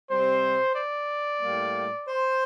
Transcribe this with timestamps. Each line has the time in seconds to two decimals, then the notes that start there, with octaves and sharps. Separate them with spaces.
0.11 C3 G3 C4 C5
0.76 D5
1.42 A2 G3 A#3
2.07 C5